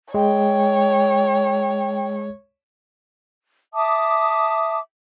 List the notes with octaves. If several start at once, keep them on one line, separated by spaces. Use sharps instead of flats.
G#3 C#5 G5
E5 A5 D6 D#6